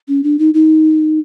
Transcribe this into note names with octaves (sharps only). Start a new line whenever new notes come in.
C#4
D4
D#4
D#4